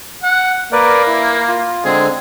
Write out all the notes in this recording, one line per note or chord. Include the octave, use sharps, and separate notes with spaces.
F#5
A#3 A#4 B4 D5
E4
F4
D3 G#3 C4 G#4